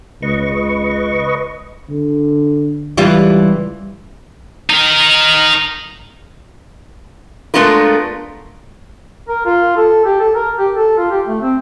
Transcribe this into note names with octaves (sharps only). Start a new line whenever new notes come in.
C#2 B4 D#5 C#6
D3
C#2 E3 G3 F4
D#4 A#4
G#3 A3 B3 D4 F4 A#4
A#4
F4
A4
G4
A4
A#4
G4
A4
F4
G4
A3
C4